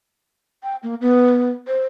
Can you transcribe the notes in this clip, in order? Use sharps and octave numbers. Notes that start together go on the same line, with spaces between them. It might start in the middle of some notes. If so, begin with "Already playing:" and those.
G5
A#3
B3
C5